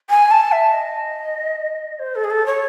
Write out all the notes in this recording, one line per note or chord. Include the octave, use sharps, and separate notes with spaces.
G#5
A5
E5
D#5
C5
A4
G#4
A4
C#5